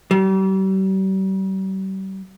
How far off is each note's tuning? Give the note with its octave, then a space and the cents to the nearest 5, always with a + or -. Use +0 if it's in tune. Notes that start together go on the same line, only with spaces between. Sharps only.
G3 -40